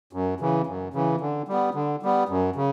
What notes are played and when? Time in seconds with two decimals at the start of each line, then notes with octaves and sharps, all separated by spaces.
0.13 F#2
0.40 C#3 E3
0.67 F#2
0.94 C#3 E3
1.21 D3
1.48 G3 B3
1.75 D3
2.02 G3 B3
2.29 F#2
2.56 C#3